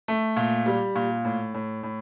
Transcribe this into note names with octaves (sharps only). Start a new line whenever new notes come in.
A3
A#2
G3
A#2
A2
A2
A2